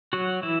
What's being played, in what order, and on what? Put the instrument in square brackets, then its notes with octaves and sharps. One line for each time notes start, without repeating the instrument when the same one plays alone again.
[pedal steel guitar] F#3 F#4
E3 E4